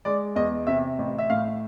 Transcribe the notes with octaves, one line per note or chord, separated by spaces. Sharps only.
G#3 D5
E2 D#5
C3 E5
A1
E5
A2 F5